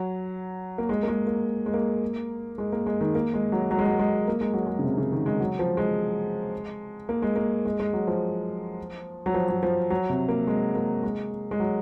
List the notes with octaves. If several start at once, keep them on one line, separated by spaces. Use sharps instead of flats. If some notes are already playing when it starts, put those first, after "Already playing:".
Already playing: F#3
A#3
G#3
A#3
G#3
A#3
G#3
A#3
G#3
A#3
G#3
D#3
A#3
G#3
F#3
F#3
G#3
F#3
G#3
A#3
G#3
F#3
G#3
C#3
C3
C#3
D#3
G#3
F#3
F3
G#3
A#3
G#3
A#3
G#3
G#3
F#3
F3
F#3
F3
F#3
F3
F#3
C3
A#3
G#3
A#3
G#3
G#3
F#3